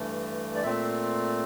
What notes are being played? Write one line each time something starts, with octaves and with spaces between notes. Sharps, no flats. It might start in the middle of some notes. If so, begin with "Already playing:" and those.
Already playing: G2 E3 A3
D5
A#2 A3 C4 E5